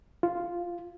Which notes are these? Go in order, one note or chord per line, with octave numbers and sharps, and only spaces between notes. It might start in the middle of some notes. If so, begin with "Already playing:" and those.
F4